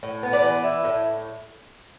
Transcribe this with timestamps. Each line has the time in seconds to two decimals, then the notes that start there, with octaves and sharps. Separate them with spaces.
0.03 A2
0.23 B3
0.33 B4 D5
0.43 E3
0.64 E4
0.84 A2